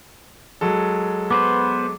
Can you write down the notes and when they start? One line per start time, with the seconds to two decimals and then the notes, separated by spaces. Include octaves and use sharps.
0.61 F#3 G#3 A4
1.30 B3 B4 C5 D6